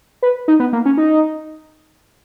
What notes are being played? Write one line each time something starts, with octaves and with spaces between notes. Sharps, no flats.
B4
D#4
B3
A#3
C#4
D#4